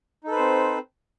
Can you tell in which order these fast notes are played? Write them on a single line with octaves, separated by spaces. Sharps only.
D#4 A4 B4 C5 C4